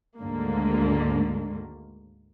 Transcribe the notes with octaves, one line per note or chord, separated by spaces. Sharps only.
D2 G#2 D3 D#3 A#3